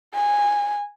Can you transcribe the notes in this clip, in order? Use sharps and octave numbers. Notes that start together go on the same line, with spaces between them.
G#5